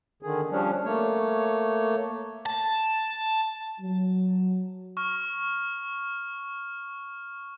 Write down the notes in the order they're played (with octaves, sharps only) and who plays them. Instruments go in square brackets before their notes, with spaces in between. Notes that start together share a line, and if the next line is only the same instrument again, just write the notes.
[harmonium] D3 D#3 G#4
F3 G3 C#4 D4
A3 A#3 C#5
[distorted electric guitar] A5
[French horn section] F#3
[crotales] C#6 F6